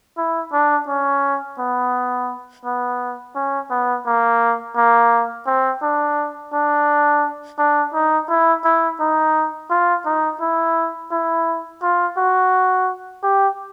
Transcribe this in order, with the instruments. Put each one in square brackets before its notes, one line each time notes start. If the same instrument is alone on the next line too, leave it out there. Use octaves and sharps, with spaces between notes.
[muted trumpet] E4
D4
C#4
B3
B3
C#4
B3
A#3
A#3
C4
D4
D4
D4
D#4
E4
E4
D#4
F4
D#4
E4
E4
F4
F#4
G4